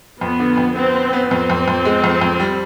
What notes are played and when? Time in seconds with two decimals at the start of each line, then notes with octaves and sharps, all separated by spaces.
0.21 F2 B3
0.40 D3
0.57 F2
0.76 B3 C4
0.94 B3
1.13 B3
1.31 F2 C4
1.50 F2
1.68 F2
1.85 G#3
2.04 F2
2.21 F2
2.40 G3